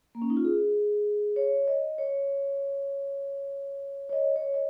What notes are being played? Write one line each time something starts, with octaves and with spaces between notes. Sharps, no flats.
A#3
C#4
D#4
F4
G#4
C#5
D#5
C#5
C#5
D#5
C#5
D#5